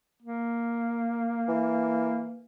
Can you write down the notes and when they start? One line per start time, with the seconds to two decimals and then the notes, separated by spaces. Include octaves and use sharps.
0.23 A#3
1.48 E3